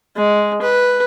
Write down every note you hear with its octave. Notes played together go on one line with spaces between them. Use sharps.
G#3
B4